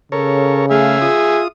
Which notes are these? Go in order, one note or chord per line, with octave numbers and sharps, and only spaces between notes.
C#3 A4 A#4 C#5
A3 G#4 E5 F5
F4 D#6